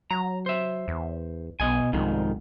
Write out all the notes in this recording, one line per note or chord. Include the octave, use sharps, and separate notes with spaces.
F#3 A#5
C5 E5
E2
B1 B2 D#5 G#5
C2 F2 G#2 D#3